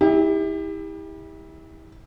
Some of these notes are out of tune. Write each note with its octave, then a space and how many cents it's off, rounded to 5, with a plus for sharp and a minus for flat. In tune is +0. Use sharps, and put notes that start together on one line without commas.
E4 -30 G4 +30